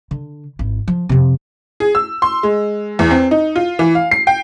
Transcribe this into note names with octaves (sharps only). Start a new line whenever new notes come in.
D3
G#1 E4
F3
F2 C3
G#4
E6
C6
G#3
E2
C4
D#4
F4
E3
F5
C7
G5